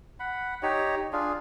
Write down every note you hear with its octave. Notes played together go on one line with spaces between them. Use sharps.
F#5 B5
D#4 G4 C#5
D4 F4 G#4